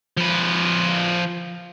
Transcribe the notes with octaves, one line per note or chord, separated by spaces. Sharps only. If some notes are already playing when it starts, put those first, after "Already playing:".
F3 B4